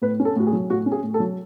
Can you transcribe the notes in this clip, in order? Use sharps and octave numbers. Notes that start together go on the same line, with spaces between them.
A2 B4
C#4
A4
A2 F#4
G#4
F#3
A2 F#4
C#4
G#4
A2
A4
F#3